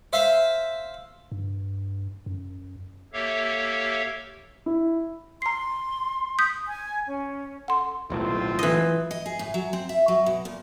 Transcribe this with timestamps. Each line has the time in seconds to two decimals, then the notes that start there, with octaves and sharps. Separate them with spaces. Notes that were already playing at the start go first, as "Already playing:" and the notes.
0.13 C5 E5 F5
1.32 G2
2.26 F#2
3.13 A#3 G4 A4 C#5 E5 F5
4.66 E4
5.42 A#5 C6 C7
6.39 D#6 G6 B6
6.68 G#5
7.07 C#4
7.68 A4 F#5 C6
8.10 D#1 B1 A2 A3 C4 F4
8.59 E3 D#5
9.11 D#5
9.26 G#4
9.39 A2
9.54 F#3
9.73 C4
9.89 E5
10.08 F#3
10.26 B2
10.45 A#2